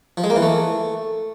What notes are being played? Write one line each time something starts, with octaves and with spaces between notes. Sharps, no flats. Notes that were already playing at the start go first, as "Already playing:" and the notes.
F3
G#3
A#3
E3
A3